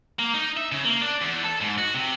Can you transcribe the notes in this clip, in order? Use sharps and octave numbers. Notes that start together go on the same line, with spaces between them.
A#3
D#4
E5
C#3
A#3
D4
E2
A4
G#2
F#4
C3